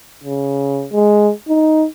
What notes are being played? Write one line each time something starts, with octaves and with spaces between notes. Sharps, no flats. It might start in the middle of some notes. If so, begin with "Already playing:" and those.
C#3
G#3
D#4